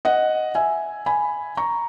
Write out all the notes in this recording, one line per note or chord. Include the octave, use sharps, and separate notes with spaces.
D#5 F#5
E5 G#5
G#5 B5
A#5 C#6